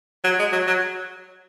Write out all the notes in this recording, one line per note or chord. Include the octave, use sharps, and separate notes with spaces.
F#3
G#3
F#3
F#3